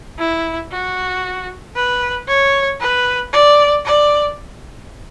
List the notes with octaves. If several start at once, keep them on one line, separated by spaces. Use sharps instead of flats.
E4
F#4
B4
C#5
B4
D5
D5